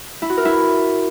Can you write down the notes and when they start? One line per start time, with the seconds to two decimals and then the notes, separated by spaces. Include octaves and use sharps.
0.22 E4
0.30 F#4
0.37 A#4
0.45 E4